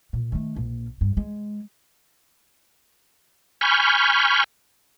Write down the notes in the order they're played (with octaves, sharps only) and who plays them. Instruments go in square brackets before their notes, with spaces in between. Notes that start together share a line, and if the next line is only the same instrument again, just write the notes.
[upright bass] A#2
D#3 A3
A#1 A#3
G2
G#3
[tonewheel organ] G#5 B5 C#6 F6 G6